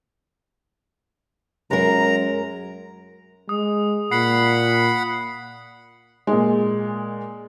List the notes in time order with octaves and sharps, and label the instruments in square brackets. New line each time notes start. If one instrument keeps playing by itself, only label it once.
[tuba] F#2 [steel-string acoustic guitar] G#3 A#4 [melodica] A#5
[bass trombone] G#3 [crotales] D#6
[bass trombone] A#2 [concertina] F#5 B5 [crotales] C7
[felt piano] A#2 G#3